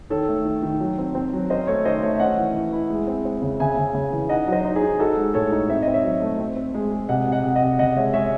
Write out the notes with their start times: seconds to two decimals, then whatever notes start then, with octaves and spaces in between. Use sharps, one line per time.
0.10 D#3 A4 C#5
0.28 A3
0.45 D#3
0.62 D#3
0.80 F#3
0.98 C4
1.15 C4
1.33 F#3
1.50 C#4 C5 D#5
1.67 A3 A4 C#5
1.85 D#3 C5 D#5
2.02 A3 C#5 E5
2.15 E5
2.20 C#4 D#5 F#5
2.37 E3
2.54 E3
2.73 E4
2.90 G#3
3.08 C4
3.25 C4
3.42 C#3
3.60 C#3 E5 G#5
3.77 C#3
3.95 C#3
4.12 E3
4.29 D#4 D#5 F#5
4.48 F#3 C5 D#5
4.65 D#4
4.76 G#4
4.82 D#4
4.99 D#4 F#4 A4
5.17 G#3
5.34 A2 A4 C#5
5.52 D#4
5.69 C4 E5
5.82 C4 D#5
5.94 C#5 E5
6.04 F#3
6.22 A3
6.39 C4
6.56 C4
6.74 G#3
6.92 G#3
7.09 C3 D#5 F#5
7.27 C3
7.32 D#5 F#5
7.44 C3
7.55 D#5 F#5
7.62 C3
7.79 C#3 D#5 F#5
7.96 G#3 C#5 E5
8.13 G#3 C#5 E5